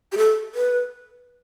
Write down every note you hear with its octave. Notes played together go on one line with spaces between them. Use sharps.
G4
A4
B4